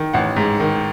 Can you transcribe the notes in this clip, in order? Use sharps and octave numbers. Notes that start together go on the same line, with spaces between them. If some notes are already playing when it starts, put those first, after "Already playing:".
Already playing: D#3
A1 F#5
G#2
D#3